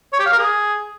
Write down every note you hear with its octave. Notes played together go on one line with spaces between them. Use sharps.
C#5
G4
F5
A#4
G#4